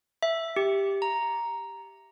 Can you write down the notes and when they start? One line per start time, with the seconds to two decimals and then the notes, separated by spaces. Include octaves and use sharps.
0.23 E5
0.56 G4
1.02 A#5